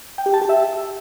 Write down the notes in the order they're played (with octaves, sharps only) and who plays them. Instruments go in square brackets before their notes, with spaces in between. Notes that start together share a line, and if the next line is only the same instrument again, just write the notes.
[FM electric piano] G5
G4
A5
G4
E5